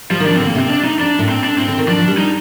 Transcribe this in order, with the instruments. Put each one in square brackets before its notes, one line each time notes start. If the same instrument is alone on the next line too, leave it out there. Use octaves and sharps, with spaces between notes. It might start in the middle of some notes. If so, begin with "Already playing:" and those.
[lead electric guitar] F3 [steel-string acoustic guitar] G3
[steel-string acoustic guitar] D#3
[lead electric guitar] D4
[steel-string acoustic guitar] F3
[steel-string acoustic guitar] D3 [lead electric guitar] C4
[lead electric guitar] A#3
[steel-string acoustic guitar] C3 [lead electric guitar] C4
[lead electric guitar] D4
D#4
[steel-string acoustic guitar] F2 [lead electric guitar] D4
[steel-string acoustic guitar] A2
[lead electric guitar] C4
D4
[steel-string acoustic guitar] A2 [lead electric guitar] C4
[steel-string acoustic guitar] D3
D#3
[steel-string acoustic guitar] F3 [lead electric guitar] D4
[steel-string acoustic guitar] F3
G3
[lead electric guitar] D#4